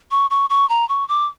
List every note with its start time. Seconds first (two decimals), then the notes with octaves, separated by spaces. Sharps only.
0.11 C#6
0.31 C#6
0.50 C#6
0.69 A#5
0.89 C#6
1.09 D6